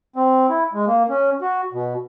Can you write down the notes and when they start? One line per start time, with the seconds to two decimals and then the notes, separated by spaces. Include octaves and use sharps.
0.16 C4
0.49 E4
0.73 G#3
0.87 A#3
1.09 C#4
1.41 F#4
1.73 B2